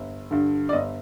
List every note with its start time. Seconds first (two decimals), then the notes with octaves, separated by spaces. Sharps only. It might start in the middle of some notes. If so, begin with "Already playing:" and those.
Already playing: G1
0.31 G2 D3
0.69 D5
0.73 G1 D#5